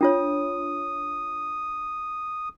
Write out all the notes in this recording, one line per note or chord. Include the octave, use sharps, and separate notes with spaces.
D4 F4 C#5 D#6